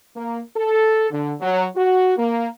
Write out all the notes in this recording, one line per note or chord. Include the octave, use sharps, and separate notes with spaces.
A#3
A4
D3
F#3
F#4
A#3